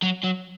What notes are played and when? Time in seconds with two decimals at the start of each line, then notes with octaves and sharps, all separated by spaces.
0.03 F#3
0.24 F#3